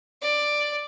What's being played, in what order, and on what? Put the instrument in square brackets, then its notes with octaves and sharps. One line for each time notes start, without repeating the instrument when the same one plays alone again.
[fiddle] D5